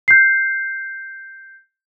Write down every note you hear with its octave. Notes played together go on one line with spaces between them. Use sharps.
G6 C7